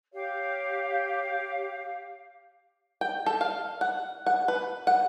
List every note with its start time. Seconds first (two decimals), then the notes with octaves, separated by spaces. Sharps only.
0.14 G4 C#5 F5
3.01 G5
3.26 A4
3.41 F5
3.81 F#5
4.26 F#5
4.48 B4
4.87 F#5